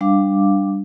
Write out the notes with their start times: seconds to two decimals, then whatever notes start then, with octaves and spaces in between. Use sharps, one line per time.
0.01 G3 D4 F5 D6